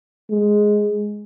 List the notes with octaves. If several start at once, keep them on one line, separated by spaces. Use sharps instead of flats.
G#3